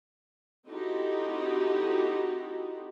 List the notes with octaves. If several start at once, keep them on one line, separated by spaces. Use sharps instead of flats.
C4 D#4 E4 F#4 G4 A4